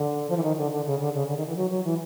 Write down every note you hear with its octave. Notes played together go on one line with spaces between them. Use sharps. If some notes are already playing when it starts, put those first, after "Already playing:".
Already playing: D3
F3
E3
D#3
D3
D3
C#3
D3
C#3
D3
D#3
E3
F#3
F#3
E3